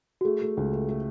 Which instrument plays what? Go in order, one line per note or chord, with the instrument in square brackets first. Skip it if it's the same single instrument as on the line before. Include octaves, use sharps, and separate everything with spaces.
[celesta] F#4
[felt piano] A3 [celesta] G#4
[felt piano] A3
C#2
A3
A3